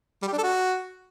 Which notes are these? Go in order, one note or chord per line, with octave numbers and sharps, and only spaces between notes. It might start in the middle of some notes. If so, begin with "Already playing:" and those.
G3
G4
D4
A4
F#4